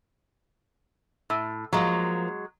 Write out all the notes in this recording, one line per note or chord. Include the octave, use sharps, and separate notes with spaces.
A2
F3 F#3 G#3 A#3